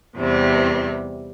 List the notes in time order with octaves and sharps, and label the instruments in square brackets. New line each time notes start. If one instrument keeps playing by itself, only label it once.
[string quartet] E2 C3 G3 C4